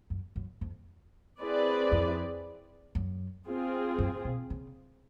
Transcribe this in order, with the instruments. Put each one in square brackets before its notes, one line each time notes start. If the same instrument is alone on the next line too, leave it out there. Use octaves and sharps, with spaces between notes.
[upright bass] F#2
F#2
F2
[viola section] C4 E4 G#4 B4 D5
[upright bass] F2
F#2
[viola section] C4 F4 G#4
[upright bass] F#2
B2
C#3